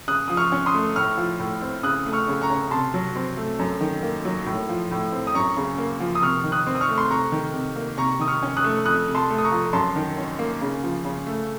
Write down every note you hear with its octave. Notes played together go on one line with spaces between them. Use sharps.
C#3 D#6 F#6
F3 D#6
C#6 F6
C#4
C6 D#6
A3
A2 C#6 F6
F3
A2
C4
C#3 D#6 F#6
A3
C#6 F6
C#3
A#5 C#6
C#4
C3 A5 C6
F#3
C4
A3
F#2
D#3
A#3
F#3
A2
F3
A2
C4
D#6
F#2 A#5 C#6
C#3
A#3
F3
D#6
C3 C#6 F6
D#3
D#6 F#6
C4
D#6
C#6 F6
A3
C6
C3 A#5 C#6
D#3
C3
A#3
C3 A#5 C#6
D#3 D#6
C#6 F6
C#4
D#6 F#6
A3
F2 D#6 F#6
C3
A5 C6
A3
D#6
A#5 C#6
F3
F#2 A5 C6
D#3
C#4
A#3
C#3
F3
C#3
A3